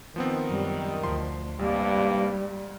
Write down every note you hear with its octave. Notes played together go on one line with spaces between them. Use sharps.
D#3 F3 B3 C4
F#2 G3
D2 F3 C6
A1 G2 C3 G3 A#3
G#2